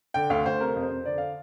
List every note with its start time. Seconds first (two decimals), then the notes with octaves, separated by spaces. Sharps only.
0.14 D3 G5
0.30 D2 F5
0.46 D2 C5
0.61 C3 A#4
0.76 F2
0.83 C5
0.91 F2
1.06 D3 D5
1.18 F5